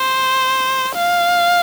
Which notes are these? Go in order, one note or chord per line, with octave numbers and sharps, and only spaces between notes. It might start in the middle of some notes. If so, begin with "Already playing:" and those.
Already playing: C5
F5